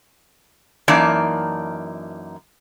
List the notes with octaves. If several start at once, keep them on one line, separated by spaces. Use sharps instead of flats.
F#2 E3 A#3 D#4 D5 A5